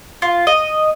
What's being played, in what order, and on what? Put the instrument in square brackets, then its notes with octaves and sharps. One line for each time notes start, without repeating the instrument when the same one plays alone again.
[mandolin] F4
D#5